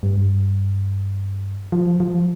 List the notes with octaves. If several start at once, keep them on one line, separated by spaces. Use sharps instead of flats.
G2
F3
F3